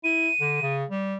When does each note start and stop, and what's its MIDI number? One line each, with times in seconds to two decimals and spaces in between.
0.04 0.29 64
0.04 0.74 99
0.41 0.62 50
0.62 0.85 49
0.90 1.18 55